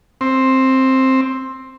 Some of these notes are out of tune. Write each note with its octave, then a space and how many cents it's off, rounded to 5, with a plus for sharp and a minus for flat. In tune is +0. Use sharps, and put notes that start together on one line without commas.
C4 +10